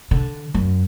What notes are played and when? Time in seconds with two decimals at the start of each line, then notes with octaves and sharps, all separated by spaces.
0.11 D3
0.54 F#2